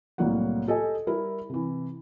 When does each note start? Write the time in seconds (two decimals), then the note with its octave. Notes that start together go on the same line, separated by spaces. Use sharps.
0.18 C2 A2 F#3 A#3 F#5
0.67 G4 A4 D#5 G#5
1.07 G3 E4 A#4
1.50 C3 E3